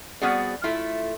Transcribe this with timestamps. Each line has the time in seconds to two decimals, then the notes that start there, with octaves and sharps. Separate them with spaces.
0.21 G3 B3 C4 F#4 G#4 D5
0.64 A3 E4 F4